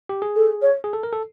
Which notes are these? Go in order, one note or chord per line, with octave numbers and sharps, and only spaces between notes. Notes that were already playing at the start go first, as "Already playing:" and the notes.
G4
G#4
A4
C#5
G#4
A4
A#4
A4